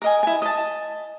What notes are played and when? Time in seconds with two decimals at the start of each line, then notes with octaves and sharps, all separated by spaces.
0.02 A#4 D#5 G#5
0.23 E4 G#5
0.42 D#5 A5